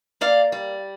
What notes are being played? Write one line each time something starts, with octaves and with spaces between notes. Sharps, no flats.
A#3 D5 F5
G3